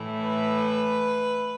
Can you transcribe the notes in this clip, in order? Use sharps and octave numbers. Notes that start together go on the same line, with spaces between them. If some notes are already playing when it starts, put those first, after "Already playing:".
Already playing: A2 E3 A3 E4
B4